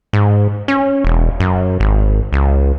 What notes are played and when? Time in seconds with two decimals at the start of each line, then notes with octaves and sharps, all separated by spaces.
0.13 G#2
0.68 C#4
1.05 E1
1.40 F#2
1.80 G#1
2.33 C#2